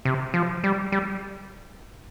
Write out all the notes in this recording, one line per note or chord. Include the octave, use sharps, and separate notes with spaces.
C3
F3
G3
G3